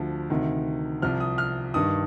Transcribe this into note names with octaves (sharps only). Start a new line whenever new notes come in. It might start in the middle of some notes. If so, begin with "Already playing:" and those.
Already playing: D2 D3 F3
D2 C3 D#3
C2 C3 F3 F6
D#6
F6
G2 D#3 D#6